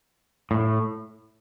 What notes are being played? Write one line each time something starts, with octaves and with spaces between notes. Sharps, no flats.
A2